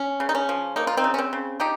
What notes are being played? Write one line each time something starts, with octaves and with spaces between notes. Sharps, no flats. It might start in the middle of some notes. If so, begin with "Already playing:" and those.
Already playing: C#4
C#3
D#4
C#4
F3
A#3 D#4
F4
C4 D#4
C#3
C#4
C4
C#3
F3 D#4 G4